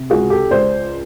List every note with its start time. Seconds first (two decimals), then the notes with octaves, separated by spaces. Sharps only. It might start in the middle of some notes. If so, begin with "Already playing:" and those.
Already playing: C3
0.10 C#2 F#4 G#4
0.30 G4 A4
0.51 C#2 C5 D5